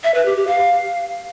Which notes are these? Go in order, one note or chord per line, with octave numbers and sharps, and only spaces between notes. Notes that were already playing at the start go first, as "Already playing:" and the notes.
E5
B4
G4
G4
F5